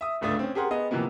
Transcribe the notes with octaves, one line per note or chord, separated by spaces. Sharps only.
E5 D#6
G1 C#2 A3 D4 D#6 A6
C4 C#4
G4 G#4 A#4 F#5 C6
B3 G#4 D#5
C3 E3 F3 A#3 B3